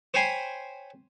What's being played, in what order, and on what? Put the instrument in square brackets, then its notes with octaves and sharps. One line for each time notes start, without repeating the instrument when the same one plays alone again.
[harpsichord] C5 C#5 G5 G#5 B5 C6